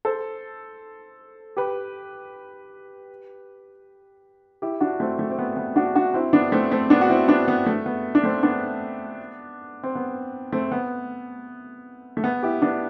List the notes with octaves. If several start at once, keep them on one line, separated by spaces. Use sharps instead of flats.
A4 C5
G4 B4
E4 G4
D4 F#4
A3 C4
A3
C4
B3
B3
D4 F#4
D4 F#4
C4 E4
B3 D4
A3 C4
A3 C4
B3 D4
F#4
C4 E4
B3 D4
B3
A3
B3
D4
A3 C4
B3 D4
C4
B3
A3 C4
B3
A3
B3
E4 G4
B3 D4